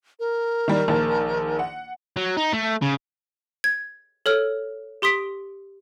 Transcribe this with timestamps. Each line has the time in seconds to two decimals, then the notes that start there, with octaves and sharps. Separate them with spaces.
0.20 A#4
0.68 D#3 G3
0.88 A#1 D#3 A5
1.59 F#5
2.16 F#3
2.37 D#4
2.52 A3
2.82 C#3
3.64 G#6
4.26 A4 C#5 F6
5.02 G4 C6 D#6 B6 D7